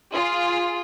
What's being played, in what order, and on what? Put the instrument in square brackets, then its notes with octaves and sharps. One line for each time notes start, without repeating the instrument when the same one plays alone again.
[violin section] F4 G#4